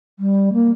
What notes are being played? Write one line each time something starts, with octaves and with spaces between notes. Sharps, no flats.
G3
A#3